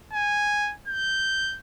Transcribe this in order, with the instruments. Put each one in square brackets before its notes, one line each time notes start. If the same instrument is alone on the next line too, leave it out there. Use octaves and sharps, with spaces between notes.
[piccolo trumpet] G#5
G6